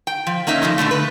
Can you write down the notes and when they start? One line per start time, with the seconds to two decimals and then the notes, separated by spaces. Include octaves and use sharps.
0.07 G5
0.27 F3
0.47 A#3 C#4 D#4 E5
0.62 C#3 F3 A3 D#4
0.78 B2 D3 D#3 A3
0.91 B4